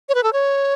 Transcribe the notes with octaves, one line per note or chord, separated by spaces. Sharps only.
C#5
B4
A4
C#5